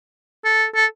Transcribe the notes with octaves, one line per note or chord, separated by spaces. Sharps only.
A4
A4